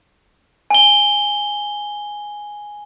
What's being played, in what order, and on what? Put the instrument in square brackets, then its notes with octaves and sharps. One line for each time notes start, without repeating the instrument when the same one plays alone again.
[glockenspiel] G#5 G7